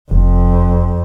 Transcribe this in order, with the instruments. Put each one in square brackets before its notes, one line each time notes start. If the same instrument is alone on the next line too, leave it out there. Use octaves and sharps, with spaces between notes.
[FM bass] F1 [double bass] F2